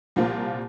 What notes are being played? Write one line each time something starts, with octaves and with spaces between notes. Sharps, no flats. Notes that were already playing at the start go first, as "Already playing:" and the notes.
C2 A#2 F3 A#3 F4